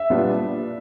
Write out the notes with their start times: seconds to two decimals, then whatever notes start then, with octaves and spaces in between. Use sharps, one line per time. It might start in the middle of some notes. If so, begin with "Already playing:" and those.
Already playing: E5
0.10 A#2 G3 B3 D4